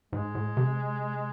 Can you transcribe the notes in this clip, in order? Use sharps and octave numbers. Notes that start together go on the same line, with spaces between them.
G#2 G#3
A2
C3